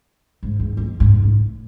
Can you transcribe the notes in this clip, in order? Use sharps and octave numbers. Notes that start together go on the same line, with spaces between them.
G#2
E2
F2
G#2
A2